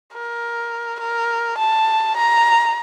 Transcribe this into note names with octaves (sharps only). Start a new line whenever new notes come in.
A#4
A#4
A5
A#5